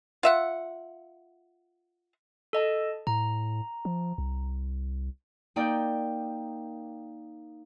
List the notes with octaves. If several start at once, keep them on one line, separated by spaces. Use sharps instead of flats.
F4 E5 F#5
A4 D#5 A5
A2 A#5
F3
C2
A#3 D#4 D5 G5